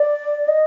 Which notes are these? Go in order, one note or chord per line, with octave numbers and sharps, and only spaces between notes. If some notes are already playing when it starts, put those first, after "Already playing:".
Already playing: D5
D#5